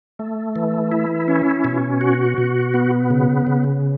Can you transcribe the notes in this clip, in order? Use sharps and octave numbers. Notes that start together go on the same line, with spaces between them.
A3
E3
E4
C#4
B2
F#4
B2
B3
C#3
C#3